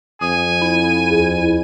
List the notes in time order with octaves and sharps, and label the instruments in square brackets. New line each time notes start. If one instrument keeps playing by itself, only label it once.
[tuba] F2 [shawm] G#5 [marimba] D#6
[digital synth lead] E4
[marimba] D#2 G#4